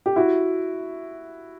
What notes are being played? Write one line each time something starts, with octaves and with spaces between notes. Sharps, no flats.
G4
E4 F#4